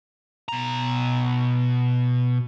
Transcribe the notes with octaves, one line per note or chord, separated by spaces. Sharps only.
B2 A#5